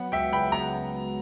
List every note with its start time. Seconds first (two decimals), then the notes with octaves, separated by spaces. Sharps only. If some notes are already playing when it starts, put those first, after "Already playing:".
Already playing: F#3 B3 F#5
0.12 C#2 E5 G5
0.33 C#3 G5 B5
0.52 B3 A#5